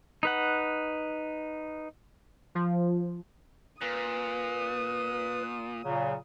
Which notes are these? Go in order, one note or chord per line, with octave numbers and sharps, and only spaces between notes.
D#4 B4 F#5
F3
A#2 B4 D#6
A#2 C#3 F#3